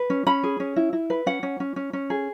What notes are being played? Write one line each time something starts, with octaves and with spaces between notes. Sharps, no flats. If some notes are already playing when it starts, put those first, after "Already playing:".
Already playing: B4
C#4
C#4 B5
G#4
C#4
E4
E4
B4
C#4 F#5
C#4
C#4
C#4
C#4
G#4